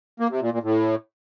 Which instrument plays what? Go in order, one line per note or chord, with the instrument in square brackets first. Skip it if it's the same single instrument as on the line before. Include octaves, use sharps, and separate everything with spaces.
[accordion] A#3
C3
A#2
A#2
A2